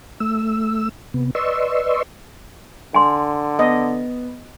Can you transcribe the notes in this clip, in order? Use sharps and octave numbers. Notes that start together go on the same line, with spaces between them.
A3 E6
C3 B3
B4 D5 D#5 C6 C#6 E6
D3 G#5 C6
B3 D#5